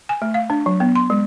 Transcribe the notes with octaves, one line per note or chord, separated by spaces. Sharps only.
G#5
A3
F5
D4
F#3
B3
C6
G#3